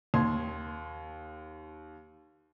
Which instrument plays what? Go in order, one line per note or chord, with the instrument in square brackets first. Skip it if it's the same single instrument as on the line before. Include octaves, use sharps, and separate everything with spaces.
[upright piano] D#2 C6 G#6